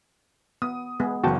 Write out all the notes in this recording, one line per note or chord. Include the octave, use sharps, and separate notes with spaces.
B3 D#6
G#3 B3 G#4
F#1 C#3 E3 B3 F#4 G5 A5 C#6